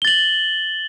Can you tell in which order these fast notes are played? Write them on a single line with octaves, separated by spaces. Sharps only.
G7 A6 F#7